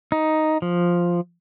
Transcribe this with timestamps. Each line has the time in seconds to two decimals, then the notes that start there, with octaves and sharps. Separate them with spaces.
0.12 D#4
0.62 F3